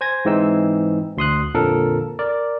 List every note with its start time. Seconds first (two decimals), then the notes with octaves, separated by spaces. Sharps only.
0.01 C5 G#5 G#6 A#6
0.25 G#2 E3 C4 D#4 E6
1.17 D2 C6 D#6 F#6
1.54 F2 A#2 D3 F3 A4 A#4
2.19 A#4 D5